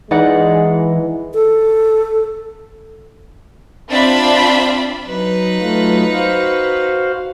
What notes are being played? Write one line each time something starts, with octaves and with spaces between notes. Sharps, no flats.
E3 G#3 D#4 D5 F#5
A4
C4 D4 F4 D5 E5 B5
F#3 D#4 B4
F#3 A3 F4
F#4 C5 F5